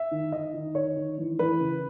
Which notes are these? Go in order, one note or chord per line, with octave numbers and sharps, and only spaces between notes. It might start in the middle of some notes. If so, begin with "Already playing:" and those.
Already playing: E5
D#3
D#3 D#5
D#3
D#3 C#5
D#3
E3
E3 B4
C#3